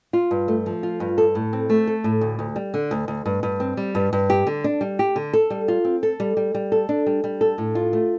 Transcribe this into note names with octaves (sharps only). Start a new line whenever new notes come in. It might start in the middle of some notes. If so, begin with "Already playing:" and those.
F4
G2
A3
F3
F4
G2
A4
A2
C4
A3
A4
A2
D2
D2
G3
D3
D2
D2
G2
G2
C4
G3
G2
G2
G4
D3
D4
G3
G4
D3
A4
G3
F4
C4
A4
G3
G3
G3
A4
D4
G3
G3
A4
A2
F4
A3